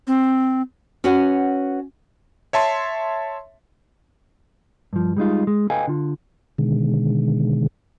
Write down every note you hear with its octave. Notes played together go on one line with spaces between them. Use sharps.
C4
C#4 F#4 B4 C#5 F#5 G#5
C#5 E5 A5 C6
G2 F3
G3 G#3 D#4 F4
G#3
A4 B4 D#5 F5 G5 G#5
D3 F4
B2 D3 D#3 G#3